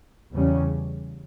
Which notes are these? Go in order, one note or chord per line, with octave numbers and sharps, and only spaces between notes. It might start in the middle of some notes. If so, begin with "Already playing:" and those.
E2 C#3 G3 C#4